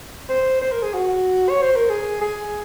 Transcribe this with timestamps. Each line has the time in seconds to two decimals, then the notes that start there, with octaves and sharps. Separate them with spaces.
0.29 C5
0.61 C5
0.72 A#4
0.82 G#4
0.94 F#4
1.49 C#5
1.62 C5
1.76 A#4
1.90 G#4
2.21 G#4